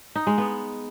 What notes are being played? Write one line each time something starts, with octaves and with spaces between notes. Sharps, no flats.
D#4
G#3
B3